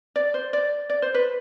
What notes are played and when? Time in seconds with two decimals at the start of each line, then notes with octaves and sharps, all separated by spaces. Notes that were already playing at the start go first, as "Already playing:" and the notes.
0.16 D5
0.34 C5
0.53 D5
0.90 D5
1.02 C5
1.14 B4